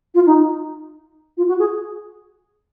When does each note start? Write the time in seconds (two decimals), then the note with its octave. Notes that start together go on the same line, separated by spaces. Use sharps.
0.14 F4
0.26 D#4
1.37 F4
1.47 F#4
1.58 G#4